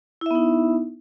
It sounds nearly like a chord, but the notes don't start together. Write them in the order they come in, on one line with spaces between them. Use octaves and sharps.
E4 E5 B3 D#4